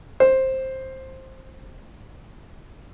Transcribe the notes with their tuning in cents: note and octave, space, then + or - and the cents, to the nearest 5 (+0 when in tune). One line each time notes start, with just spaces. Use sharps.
C5 +10